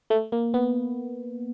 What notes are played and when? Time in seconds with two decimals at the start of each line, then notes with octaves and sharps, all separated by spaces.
0.10 A3
0.32 A#3
0.54 B3